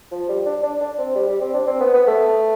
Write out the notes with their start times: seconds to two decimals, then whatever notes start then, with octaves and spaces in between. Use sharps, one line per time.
0.11 F3
0.29 G3
0.46 D4
0.63 D4
0.80 D4
0.98 C4
1.15 G3
1.28 G3
1.41 C4
1.54 D4
1.67 C4
1.80 B3
1.94 B3
2.07 A3